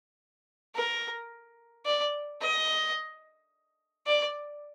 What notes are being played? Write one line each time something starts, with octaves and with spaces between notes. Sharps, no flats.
A#4
D5
D#5
D5